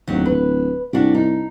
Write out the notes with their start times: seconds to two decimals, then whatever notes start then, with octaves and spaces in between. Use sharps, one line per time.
0.07 D1 D#2 F#3
0.26 B4
0.93 C2 D4 F#4 G4
1.15 D#4